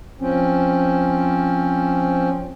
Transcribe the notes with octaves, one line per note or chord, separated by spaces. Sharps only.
F3 C4 C#4